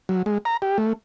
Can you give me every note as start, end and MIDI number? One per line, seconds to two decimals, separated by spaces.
0.09 0.22 54
0.26 0.38 56
0.45 0.57 82
0.62 0.78 67
0.78 0.93 57